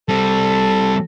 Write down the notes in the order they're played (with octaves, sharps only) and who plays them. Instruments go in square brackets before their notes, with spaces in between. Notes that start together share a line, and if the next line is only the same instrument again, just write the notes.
[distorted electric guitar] G3 C4 [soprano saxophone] A4